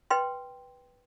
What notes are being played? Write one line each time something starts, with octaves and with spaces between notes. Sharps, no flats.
B4 G5 C6